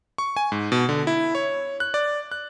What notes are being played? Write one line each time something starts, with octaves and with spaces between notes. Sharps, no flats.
C#6
G#5
G#2
B2
D3
E4
C#5
F#6
D5
F#6